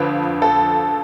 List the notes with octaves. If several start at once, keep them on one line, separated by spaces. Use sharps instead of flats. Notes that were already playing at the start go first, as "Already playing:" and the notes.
Already playing: F2 D3 F3 B4
A4